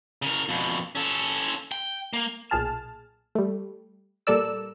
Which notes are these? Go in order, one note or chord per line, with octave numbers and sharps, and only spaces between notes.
C#3 A#4
F2 B2
C#4 A4
G5
A#3
B1 A#2 G#4 A5 F6 E7
G3 A3
A#2 G3 A4 A#4 D5 E6